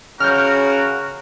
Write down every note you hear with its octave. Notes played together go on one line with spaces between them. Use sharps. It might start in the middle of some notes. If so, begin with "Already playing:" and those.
C#3 F#4 A#4 F6 G6